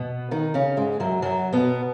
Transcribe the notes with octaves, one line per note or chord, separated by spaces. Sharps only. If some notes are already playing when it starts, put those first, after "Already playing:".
Already playing: B2 B3
D#3 D#4
C#3 C#4
G#2 G#3
F#2 F#3
F#2 F#3
B2 B3